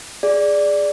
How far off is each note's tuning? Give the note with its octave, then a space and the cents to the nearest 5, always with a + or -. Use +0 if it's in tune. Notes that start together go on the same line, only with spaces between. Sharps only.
G#4 +0 D5 +0